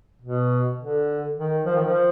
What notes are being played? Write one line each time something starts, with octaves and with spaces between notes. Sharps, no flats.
B2
D3
D#3
F3
D#3
F3